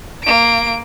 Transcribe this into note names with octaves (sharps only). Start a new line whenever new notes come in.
A#3 D7